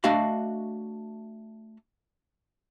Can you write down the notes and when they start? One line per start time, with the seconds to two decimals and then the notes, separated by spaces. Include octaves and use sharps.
0.04 A3 D4 F#4 D#5 F5 B5